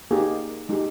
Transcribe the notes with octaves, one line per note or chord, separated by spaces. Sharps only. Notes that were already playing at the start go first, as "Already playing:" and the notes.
A#3 D#4 G4 G#4
G#3 D#4 G4